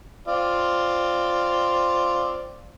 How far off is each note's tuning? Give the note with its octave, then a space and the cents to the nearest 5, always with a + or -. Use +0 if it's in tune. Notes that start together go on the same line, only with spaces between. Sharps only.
C4 +0 F4 +0 D5 +0